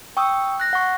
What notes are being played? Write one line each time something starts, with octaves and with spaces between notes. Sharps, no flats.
G5 C#6 D#6 E6
F#6 A#6
F#5 C#6